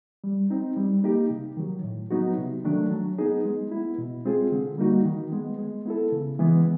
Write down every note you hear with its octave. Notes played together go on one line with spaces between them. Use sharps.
G3
C4 D#4
G3
A#3 D#4 G4
C3
D#3 F#3
A2
F#3 B3 D#4 F#4
C3
D#3 F#3 A3 D4
F#3
B3 D#4 G#4
G#3
B3 E4
B2
G#3 C4 F4 G#4
D3
G3 A#3 D#4 F#4
D#3
G#3 B3
G#3
B3 E4 A4
C#3
E3 G#3 B3